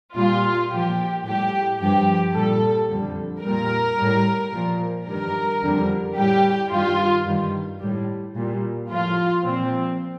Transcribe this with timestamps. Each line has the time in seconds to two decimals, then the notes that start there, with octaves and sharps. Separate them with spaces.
0.15 A#2 G3 F4
0.70 A#2 F3 G4
1.24 A2 G3 G4
1.79 G2 F3 G4
2.33 A#2 G3 A4
2.89 F2 D3 G3
3.43 A#2 G3 A#4
3.98 A2 G3
4.53 A#2 F3
5.06 G2 D#3 G3 A#4
5.62 F2 D3 G3
6.16 A2 G3 G4
6.71 G2 D#3 G3 F4
7.26 G2 D#3 G3
7.81 A2 G3
8.34 A#2 G3
8.89 A2 F3 F4
9.44 A#2 F3 C4